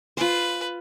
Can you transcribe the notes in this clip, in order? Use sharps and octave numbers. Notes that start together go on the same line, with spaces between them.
F4 B4 C5